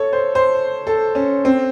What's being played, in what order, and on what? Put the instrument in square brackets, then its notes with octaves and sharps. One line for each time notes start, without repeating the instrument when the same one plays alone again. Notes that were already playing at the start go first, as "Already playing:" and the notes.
Already playing: [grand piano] A4 C#5
C5
C5
A4
C#4
C4